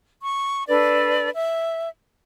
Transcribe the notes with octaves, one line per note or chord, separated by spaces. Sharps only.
C#6
D4 A4 B4 D5
E5